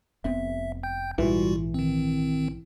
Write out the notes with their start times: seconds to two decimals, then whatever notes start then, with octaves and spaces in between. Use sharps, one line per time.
0.24 F1 B3 C4 E5
0.83 G5 G6
1.18 A#1 G#2 E3 G3 F4 F#4
1.74 D#3 C4